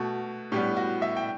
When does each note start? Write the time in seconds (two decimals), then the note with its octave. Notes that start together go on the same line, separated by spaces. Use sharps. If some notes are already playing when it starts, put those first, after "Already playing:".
Already playing: B2 A3 F#4
0.52 A2 G3 B3 G4
0.77 F#4
1.02 E5
1.17 G5